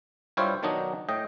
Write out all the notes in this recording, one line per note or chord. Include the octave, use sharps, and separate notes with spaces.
G2 G3 E4 F4 C5 C#5
B2 D#3 F#3 D4 D#4
A2 D#5 G5